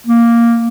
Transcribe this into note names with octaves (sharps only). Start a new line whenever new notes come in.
A#3